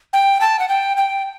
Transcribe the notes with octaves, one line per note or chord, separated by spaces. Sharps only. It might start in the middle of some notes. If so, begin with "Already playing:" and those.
G5
A5
F#5
G5
G5